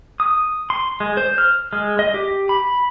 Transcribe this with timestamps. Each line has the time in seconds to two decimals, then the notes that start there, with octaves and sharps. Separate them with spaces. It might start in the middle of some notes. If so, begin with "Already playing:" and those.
0.20 D#6
0.70 C6
1.00 G#3
1.17 C5
1.38 F6
1.73 G#3
1.99 D#5
2.14 G4
2.49 B5